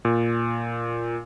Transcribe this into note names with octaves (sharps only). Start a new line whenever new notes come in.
A#2